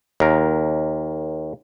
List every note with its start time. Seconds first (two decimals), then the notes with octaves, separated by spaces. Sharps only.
0.20 D#2 A#4